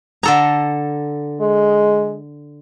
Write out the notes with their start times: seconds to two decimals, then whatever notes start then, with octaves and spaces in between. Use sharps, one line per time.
0.23 D3 A4 A#5
1.41 G#3